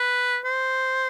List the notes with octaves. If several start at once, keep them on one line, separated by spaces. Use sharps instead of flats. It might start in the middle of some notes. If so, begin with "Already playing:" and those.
Already playing: B4
C5